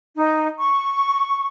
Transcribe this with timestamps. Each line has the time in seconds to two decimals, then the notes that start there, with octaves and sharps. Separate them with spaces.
0.16 D#4
0.60 C#6